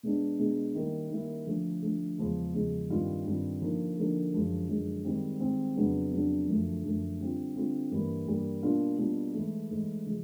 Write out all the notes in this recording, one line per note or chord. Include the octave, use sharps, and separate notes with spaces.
B2 G#3 B3 D4
B2 G#3 B3 D4
D#3 G3 A#3 C#4 E4
D#3 G3 A#3 C#4 E4
D3 F3 A3
D3 F3 A3
E2 C#3 F3 G#3
E2 C#3 F3 G#3
G2 D#3 G3 C4 F4
G2 D#3 G3 C4 F4
D3 F3 A#3 D#4
D3 F3 A#3 D#4
F#2 D3 F3 G#3 C#4
F#2 D3 F3 G#3 C#4
G#2 D#3 G3 C4
G#2 D#3 G3 C4
F2 C#3 F#3 B3 D4
F2 C#3 F#3 B3 D4
F#2 D3 F3 A3
F#2 D3 F3 A3
D3 G3 C4 F4
D3 G3 C4 F4
G2 E3 G3 A#3
G2 E3 G3 A#3
B2 G3 A#3 D4 F4
B2 G3 A#3 D4 F4
G#2 E3 A3
G#2 E3 A3
C#3 F3 G#3